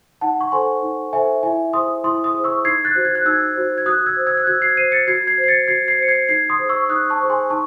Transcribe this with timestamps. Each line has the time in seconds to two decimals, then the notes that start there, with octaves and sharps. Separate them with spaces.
0.21 D#4 F#5 A5
0.41 C#6
0.52 A4 C5 G#5 C6
0.83 D#4
1.13 A4 C5 E5 G#5
1.43 E4 E5 G#5
1.73 G#4 C5 C6 D#6
2.04 E4 C6 D#6
2.24 C6 D#6
2.34 G#4 C5
2.44 C#6 E6
2.65 D#4 G#6 C7
2.85 F#6 A6
2.95 F#4 C5
3.05 G#6
3.15 F#6
3.26 D#4 E6 G#6
3.56 F#4 C5
3.78 G#6
3.86 F#4 D#6 F#6
4.06 E6 G#6
4.17 C5
4.27 E6 G#6
4.37 F#6
4.47 F#4 E6 G#6
4.62 G#6 C7
4.77 C5 C7 D#7
4.92 A6 C#7
5.07 F#4 G#6 C7
5.27 G#6 C7
5.38 C5
5.44 C7
5.48 A6 C#7
5.68 F#4 G#6 C7
5.88 G#6 C7
5.99 C5 C#7
6.08 G#6 C7
6.28 D#4 G#6 C7
6.50 C6 D#6
6.59 G#4 C5
6.69 C#6 E6
6.89 D#4 D#6 F#6
7.10 A5 C#6
7.21 G#4 C5
7.30 G#5 C6
7.50 D#4 A5 C#6